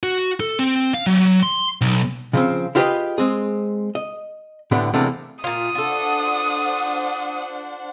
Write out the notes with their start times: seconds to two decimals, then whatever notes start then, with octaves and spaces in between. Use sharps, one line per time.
0.03 F#4
0.40 A4
0.59 C4
0.94 F5
1.07 F#3
1.43 C6
1.81 B1
2.33 C#3 F3 C4
2.75 E4 F4 G4 G#4 B4 D#5
3.18 G#3 C4 G#4
3.95 D#5
4.71 A2 D3 B3 D4 G4 B4
4.94 E2 C3 A3 A#3 D4
5.44 A#2 F4 D#6
5.75 D4 F4 A4 C5 F#5